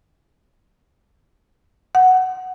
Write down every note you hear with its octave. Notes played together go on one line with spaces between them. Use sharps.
F#5